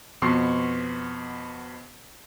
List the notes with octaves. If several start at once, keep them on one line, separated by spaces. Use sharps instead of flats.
F2 B2 B3 C6 C#6 C7